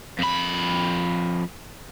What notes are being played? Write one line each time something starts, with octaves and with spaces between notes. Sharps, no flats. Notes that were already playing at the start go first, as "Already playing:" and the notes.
F2 B5